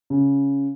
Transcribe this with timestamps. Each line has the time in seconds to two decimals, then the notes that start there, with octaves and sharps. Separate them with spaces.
0.10 C#3